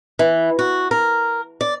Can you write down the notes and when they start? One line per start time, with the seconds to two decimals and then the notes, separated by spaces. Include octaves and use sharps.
0.19 E3
0.59 F#4
0.91 A#4
1.61 D5